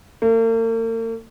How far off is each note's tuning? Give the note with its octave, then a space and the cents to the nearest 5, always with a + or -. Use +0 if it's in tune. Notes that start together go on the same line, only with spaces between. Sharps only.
A#3 -45